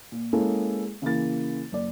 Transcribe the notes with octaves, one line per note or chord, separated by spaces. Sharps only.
A#2
G#3 A#3 C#4 E4 G#4 A4
C#3 E3 A#3 A6
F#1 D5